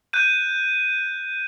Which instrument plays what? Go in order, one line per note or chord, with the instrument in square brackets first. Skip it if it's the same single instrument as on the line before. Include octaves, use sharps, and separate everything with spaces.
[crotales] F#6 G6 D#7